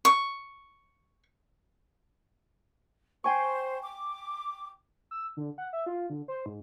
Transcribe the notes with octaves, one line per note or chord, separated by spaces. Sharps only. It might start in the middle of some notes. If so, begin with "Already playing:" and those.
C#6
C5 G5 G#5 C#6
D6
E6
D3
F#5
E5
F4
D3
C5
G#2